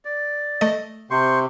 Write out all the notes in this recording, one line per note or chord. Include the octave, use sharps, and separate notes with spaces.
D5
A3 D#5
C3 C5 C6 C#6